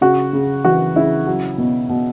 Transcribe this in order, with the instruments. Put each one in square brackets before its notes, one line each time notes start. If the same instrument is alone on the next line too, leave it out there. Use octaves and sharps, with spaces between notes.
[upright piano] C#3 F#4
C#3
E3 F#4
C#3 E4
F#3
B2
B2